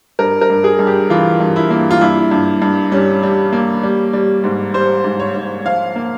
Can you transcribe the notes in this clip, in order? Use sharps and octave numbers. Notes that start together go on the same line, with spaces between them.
G2 A#4
A#4
G2
G#4
G2
G4
E3 F4
G2
E4
A#3
F4
G2 E4
G2
G2
G3 C#4
G3
A#3
G3
G3
G#2
G3 C5
G#2
C#5
G#2
F3 F5
A#3